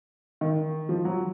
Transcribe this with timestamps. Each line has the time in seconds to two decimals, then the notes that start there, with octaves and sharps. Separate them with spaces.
0.41 D#3
0.89 F3
1.05 F#3